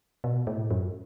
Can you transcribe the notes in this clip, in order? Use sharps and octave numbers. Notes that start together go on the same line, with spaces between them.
B2
A2
F#2